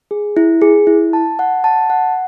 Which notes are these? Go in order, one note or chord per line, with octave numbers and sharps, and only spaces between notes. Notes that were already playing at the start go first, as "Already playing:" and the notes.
G#4
E4
G#4
E4
A5
F#5
A5
F#5